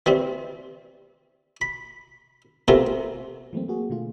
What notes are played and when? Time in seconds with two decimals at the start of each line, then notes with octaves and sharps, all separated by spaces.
0.06 E3 G3 C4
1.61 B5
2.68 C3 A3 B3 C#4 F4 A#4
3.53 E3 F#3 A3 A#3 C4
3.68 A#3 F#4 G#4
3.90 B2 D3 A3 F4